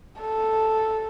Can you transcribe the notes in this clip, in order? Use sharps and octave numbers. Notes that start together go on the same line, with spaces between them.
A4